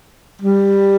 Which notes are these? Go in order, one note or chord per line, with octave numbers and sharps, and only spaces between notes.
G3